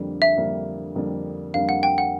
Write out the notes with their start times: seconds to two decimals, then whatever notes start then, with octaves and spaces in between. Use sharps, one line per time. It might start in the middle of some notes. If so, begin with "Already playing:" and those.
Already playing: F2 D3 G3 A#3 D4
0.22 E5
0.36 F2 D3 G3 A#3 D4
0.95 F2 D3 G3 A#3 D4
1.54 F2 D3 G3 A#3 D4 F5
1.69 F#5
1.83 G5
1.98 F#5